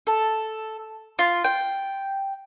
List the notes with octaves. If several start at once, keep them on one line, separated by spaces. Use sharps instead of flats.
A4
F4
G5